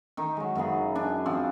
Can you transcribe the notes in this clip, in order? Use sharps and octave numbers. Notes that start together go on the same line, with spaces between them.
D#3 D#4
F#3 G#3
F#2 C#3 B3 G#4
D4 G#5
F3 C4 D5